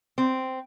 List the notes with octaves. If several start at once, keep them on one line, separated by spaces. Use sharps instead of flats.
C4